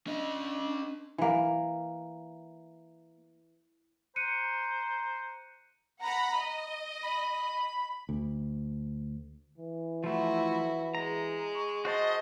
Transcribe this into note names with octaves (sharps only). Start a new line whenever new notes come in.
C#4 D4 D#5
E3 A#3
C5 A#5 F#6 C#7 D#7
F#5 A#5 B5
D#5
B5
D2
E3
F3 A3 E4 F#4
G#3 A#5
C#6
F#4 C5 D#5 A5